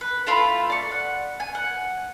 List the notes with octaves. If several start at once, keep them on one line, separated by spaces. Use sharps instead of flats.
B4
A3 E4 F4 B5
D5 C#6
F#5
G#5
F#5